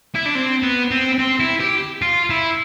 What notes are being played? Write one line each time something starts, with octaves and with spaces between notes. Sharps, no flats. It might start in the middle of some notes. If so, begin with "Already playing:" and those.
E4
D4
C4
B3
C4
C4
E4
G4
F4
E4